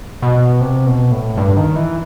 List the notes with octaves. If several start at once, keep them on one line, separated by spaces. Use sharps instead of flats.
B2
C3
B2
A2
G2
D#3
E3